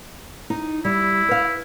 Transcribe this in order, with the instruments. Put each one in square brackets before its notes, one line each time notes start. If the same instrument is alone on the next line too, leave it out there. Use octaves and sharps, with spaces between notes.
[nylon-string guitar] D#4
[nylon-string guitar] G3 [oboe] E4
[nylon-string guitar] B4 F5